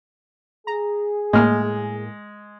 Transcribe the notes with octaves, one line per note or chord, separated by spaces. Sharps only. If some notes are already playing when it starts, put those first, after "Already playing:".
G#4 A#5
A2 G#3 A#3 F6